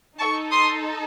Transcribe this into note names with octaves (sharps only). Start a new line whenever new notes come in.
D#4 A4 A5 C#6
C6 D#6